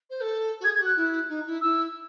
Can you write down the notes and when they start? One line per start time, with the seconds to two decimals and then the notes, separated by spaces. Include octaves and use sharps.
0.09 C5
0.20 A4
0.60 F#4
0.64 G#4 G#6
0.75 G#4 G#6
0.80 F#4
0.86 F#6
0.96 E4
1.29 D#4
1.46 E4
1.61 E4 E6